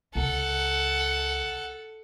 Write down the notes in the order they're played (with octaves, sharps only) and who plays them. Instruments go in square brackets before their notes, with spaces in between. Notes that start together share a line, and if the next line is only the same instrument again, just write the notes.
[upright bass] C#2 [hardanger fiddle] A4 F#5